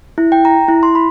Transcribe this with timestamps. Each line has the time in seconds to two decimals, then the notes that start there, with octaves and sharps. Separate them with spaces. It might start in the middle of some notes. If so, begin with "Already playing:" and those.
0.18 E4
0.32 G5
0.45 A#5
0.68 E4
0.83 C6
0.95 B5